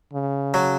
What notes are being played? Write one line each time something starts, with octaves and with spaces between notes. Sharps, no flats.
C#3
F#3